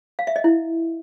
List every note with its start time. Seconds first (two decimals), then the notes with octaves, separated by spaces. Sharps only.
0.19 F5
0.27 E5
0.36 D#5
0.44 E4